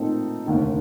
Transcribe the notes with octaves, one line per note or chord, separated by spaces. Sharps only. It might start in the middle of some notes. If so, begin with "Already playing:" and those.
Already playing: A#2 A3 C4 D#4 A4
F1 D#2 D3